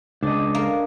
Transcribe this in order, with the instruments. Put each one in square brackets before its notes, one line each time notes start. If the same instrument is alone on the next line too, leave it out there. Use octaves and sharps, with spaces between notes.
[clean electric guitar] C#2 [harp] D4 D#5
[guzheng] A#3